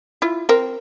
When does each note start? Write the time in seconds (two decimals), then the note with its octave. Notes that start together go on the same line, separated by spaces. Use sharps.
0.22 E4 F4
0.49 C4 A#4